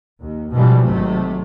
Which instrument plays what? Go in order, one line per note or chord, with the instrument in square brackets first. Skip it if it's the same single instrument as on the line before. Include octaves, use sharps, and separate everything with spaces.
[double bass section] D#2
G#2 B2 E3 F3 G3
G#1 C3 F#3 A3